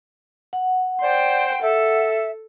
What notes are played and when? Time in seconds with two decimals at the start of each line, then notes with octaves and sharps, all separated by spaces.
0.53 F#5
1.02 C5 D5 G5
1.62 A4 E5